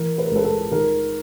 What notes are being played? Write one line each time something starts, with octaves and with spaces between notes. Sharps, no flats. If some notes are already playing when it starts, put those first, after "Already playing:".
Already playing: E3 A#4
B4
A#4
C#2 A4 B4
A4
D#3 A#4